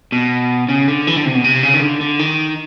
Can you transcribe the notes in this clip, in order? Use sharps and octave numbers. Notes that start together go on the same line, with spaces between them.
B2
C#3
D3
E3
D3
C3
B2
C3
C#3
D#3
D3
D3
D#3